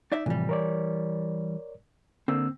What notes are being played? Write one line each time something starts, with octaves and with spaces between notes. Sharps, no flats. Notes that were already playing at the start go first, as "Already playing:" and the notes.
D#4 D5 E5
A2 C3 E3 F3 G3
A#4 C#5 D5
D3 A#3 C4 E6